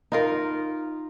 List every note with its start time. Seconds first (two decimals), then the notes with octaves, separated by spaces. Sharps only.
0.12 D#4 F4 A#4